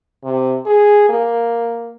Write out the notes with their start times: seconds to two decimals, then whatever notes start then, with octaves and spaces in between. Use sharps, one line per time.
0.24 C3
0.66 G#4
1.09 A#3